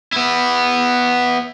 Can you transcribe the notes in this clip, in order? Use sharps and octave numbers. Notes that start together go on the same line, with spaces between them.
B3 E4